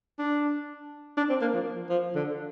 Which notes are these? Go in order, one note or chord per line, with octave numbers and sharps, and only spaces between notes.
D4
D4
C4
A#3
F3
F3
D3